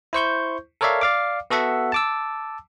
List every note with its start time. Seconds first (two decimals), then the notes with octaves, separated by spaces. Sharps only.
0.13 E4 C5 C#6 G6
0.81 A4 A#4 C#5 D5 E5 F5
1.01 D5 F5 D6
1.50 B3 F#4 A4 E5 F#5
1.92 A5 D6 E6